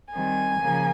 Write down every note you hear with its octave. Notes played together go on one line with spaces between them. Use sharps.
D#3 G3 C4 G#5
C#3 F3 A#3